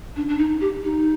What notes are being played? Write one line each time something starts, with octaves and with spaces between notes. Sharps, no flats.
D4
D4
D#4
G4
D#4